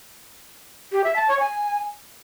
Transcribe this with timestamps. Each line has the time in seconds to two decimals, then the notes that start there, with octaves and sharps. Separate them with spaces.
0.92 G4
1.04 E5
1.16 A5
1.28 C#5
1.40 G#5